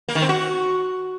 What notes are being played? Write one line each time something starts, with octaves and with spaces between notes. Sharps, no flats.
A#3
D#3
C4
F#4